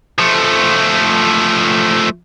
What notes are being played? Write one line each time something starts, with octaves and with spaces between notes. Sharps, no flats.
F3 A3